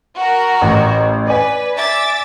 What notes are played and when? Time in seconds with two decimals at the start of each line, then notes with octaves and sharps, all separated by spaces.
0.15 F#4 A#4
0.62 A1
1.27 B4 D5 G#5
1.77 E5 D6 A6